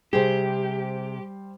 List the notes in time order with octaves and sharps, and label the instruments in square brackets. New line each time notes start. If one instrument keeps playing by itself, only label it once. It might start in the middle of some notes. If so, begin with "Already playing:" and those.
[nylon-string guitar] C3 G#4 [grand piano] G3 C5 [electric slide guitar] G4